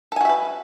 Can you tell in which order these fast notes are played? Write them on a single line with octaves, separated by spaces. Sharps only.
A4 G#5 F#4 E5 B4